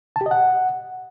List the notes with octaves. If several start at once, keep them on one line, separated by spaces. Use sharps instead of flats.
A5
G4
D#5
F#5